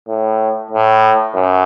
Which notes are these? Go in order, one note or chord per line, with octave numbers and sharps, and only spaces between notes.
A2
A2
F#2